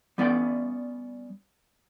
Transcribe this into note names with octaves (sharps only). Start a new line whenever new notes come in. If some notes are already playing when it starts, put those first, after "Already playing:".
G3 B3 C#4 D5 G5